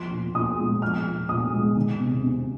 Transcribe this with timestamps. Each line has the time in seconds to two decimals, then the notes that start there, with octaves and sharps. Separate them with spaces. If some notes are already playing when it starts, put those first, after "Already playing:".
Already playing: F3 C6
0.11 A#2
0.35 A#2 D#6
0.58 G#3
0.82 F3 F6
1.05 A#2
1.29 A#2 D#6
1.53 G#3
1.77 D#3
2.00 C3
2.23 C3